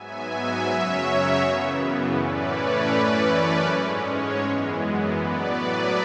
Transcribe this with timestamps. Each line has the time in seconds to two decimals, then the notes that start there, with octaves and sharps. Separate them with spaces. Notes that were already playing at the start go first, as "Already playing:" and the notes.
Already playing: G#2 F#3 B3 E5 G#5
0.66 F#2 C#3 F#3 C#4 C#5 E5
1.42 F#2 C#3 E3 B3
2.16 A2 E3 A3 C#4 B4 D5
2.54 C#5
2.91 F#2 E3 A3 C#4 B4 D5
3.29 B4 D5
3.66 G#2 G#3 C#4
4.05 C#5
4.41 F#2 E3 G#3 B3
5.17 A2 F#3 B3 B4 D5